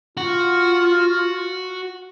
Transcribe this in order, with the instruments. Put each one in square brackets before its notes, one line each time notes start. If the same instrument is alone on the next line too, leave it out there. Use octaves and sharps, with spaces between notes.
[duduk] F4 [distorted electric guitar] F#4